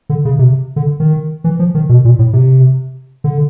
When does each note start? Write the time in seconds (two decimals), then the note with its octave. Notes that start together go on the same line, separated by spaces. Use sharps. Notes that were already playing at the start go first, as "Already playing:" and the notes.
0.09 D3
0.25 C#3
0.39 C3
0.76 D3
1.00 D#3
1.44 E3
1.59 F3
1.75 D#3
1.89 B2
2.05 A#2
2.19 A2
2.33 C3
3.24 D3